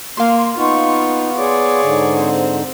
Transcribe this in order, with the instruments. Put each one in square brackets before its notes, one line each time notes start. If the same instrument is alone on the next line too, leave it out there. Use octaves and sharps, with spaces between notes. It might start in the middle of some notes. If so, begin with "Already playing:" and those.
[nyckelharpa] A#3 [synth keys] F5 C6
[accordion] B3 [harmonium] D#4 [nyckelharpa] F4 C#6
[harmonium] G#4 C#5 [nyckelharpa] D5
[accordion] G#2 D3
[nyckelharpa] C4